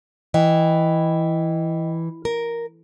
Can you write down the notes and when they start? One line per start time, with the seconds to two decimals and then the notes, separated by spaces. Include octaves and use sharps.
0.34 E3 D#5 G5
2.25 A#4